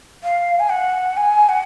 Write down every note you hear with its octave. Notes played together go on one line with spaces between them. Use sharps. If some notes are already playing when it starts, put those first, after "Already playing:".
F5
G#5
F#5
G#5
F#5